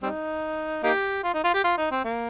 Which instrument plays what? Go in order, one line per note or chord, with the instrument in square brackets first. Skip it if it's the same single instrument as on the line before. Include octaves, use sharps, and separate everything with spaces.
[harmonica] G3 C4 D#4
A#3 D#4 G4
F4
D#4
F4
G4
F4
D#4
C4
A#3